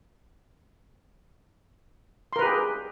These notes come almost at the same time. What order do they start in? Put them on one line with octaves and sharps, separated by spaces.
C6 A#4 B4 G4 G#4